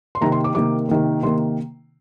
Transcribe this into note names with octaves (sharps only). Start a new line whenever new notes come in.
C6
C3 D#3 A#3 A#5
C6
D6
C3 D#3 A#3 D6
C3 D#3 A#3
C3 D#3 A#3 C6